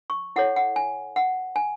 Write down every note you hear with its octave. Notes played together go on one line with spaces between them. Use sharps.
C#6
E4 A4 C#5 F#5
F#5
G#5
F#5
G#5